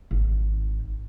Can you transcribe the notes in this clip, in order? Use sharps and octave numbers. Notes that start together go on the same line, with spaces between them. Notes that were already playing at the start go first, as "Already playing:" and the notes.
G#1